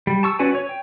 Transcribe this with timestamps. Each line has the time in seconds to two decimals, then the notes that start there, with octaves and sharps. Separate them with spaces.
0.07 G3
0.23 A5 C#6 E6
0.39 C#4 F#4 B4 D5 G#5
0.55 C#5
0.69 G5